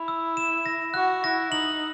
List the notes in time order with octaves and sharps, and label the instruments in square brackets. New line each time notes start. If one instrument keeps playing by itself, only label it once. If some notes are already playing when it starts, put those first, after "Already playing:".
Already playing: [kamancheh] E4 [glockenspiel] B5
[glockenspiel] E6
E7
A#6
[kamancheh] F#4 [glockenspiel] F#6
[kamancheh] E4 [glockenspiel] A#6
[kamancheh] D#4 [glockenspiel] F#7